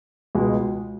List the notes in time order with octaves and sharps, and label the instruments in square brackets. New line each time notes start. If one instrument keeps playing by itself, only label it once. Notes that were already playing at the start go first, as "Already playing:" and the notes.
[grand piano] C#2 B2 G#3